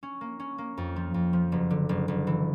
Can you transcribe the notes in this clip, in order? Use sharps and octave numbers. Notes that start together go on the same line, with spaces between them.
C#4
A#3
C#4
A#3
F2
F3
F2
F3
F#1
D3
F#1
F#1
E3